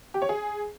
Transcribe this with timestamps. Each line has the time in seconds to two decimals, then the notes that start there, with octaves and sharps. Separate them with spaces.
0.14 G4
0.22 C#5
0.29 G#4